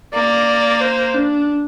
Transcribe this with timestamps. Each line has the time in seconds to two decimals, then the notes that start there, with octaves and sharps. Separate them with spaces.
0.13 A#3 D5
0.81 C5
1.14 D4